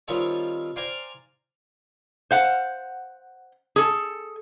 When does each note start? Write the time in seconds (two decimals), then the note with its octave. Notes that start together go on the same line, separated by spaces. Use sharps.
0.08 D#3 F3 G3 C4 F4 C#5
0.76 C5 D5 F5 G5 G#5 A#5
2.31 C5 F5 F#5
3.76 G#4 A4